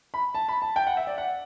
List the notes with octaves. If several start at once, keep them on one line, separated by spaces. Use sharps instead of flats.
B5
A5
B5
A5
G5
F#5
E5
D5
F#5